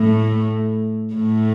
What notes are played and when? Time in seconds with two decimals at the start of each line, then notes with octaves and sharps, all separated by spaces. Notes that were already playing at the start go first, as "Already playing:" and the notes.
Already playing: A2 A3
1.14 A2 A3